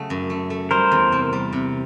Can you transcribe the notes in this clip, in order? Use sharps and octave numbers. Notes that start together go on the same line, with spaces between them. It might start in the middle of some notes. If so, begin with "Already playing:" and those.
Already playing: C#3 F#3 A3
F#2
A3
A3
G3 A#4 C5
E2
C3
G3
C3